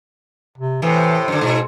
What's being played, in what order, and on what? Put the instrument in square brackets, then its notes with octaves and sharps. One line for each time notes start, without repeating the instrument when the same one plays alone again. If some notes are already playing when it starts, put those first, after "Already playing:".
[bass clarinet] C3
[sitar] A2 C3 [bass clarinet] E3
[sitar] F#2 D3
[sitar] G#2 [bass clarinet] B2